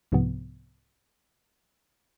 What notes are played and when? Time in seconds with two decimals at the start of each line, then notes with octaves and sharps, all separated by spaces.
0.12 C2 G#2 C3 F3 B3